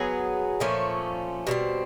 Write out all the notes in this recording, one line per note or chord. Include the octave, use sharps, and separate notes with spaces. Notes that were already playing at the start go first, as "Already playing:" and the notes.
Already playing: F#3 B3 G#4
A#2 F3 A3 C#4
B2 G3 C4